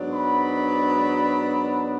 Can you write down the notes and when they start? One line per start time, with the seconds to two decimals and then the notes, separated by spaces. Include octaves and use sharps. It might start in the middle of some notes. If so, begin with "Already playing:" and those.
Already playing: G#2 F#3 B3 D4
0.11 B5